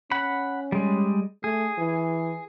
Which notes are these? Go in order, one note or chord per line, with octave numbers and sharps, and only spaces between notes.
C#4 F#5 B5
G3 G#3
A3 G#4
E3